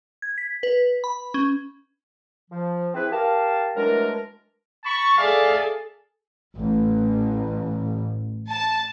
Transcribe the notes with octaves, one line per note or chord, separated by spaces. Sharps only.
G#6
B6
B4
B5
C#4
F3
E3 C4 E4 G#4 B4
G4 A#4 F5 A5
E3 F#3 G#3 A3 D4 A#4
A5 B5 C#6
G#4 A4 D5 E5 F5
A1
A5